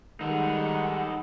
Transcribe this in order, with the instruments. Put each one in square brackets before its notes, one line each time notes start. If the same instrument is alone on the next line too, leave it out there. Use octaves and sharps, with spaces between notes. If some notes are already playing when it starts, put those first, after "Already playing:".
[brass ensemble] D#3 G3 G#3 [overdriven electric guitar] D#4 A4 [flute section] F#5